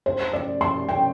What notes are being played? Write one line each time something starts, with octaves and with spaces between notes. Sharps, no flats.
C5
D5
C6
G5